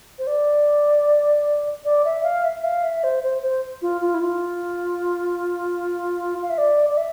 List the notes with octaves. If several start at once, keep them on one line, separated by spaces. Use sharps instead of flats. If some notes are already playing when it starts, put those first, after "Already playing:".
C5
D5
D5
E5
F5
E5
F5
E5
C5
C5
C5
F4
F4
E4
F4
F5
E5
D5
D5
E5